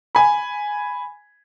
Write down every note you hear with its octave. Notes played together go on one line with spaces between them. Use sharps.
G#5 B5